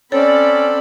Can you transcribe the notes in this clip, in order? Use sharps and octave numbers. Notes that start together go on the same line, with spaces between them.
C4 C#4 A4 C#5 D5 B5